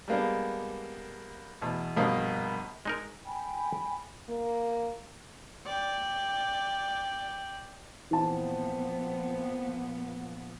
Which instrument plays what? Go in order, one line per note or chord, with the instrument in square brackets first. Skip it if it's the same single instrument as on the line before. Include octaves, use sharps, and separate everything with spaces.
[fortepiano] G3 G#3 A#3 B3 D4
E2 B2
A#1 G2 B2 A#3 D#6
[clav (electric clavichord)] G#3 D#4 A#4
[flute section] G5 G#5 B5
[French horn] A#3
[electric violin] D5 G5
[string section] A#2 F3 B3 [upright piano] E3 A5 [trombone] C4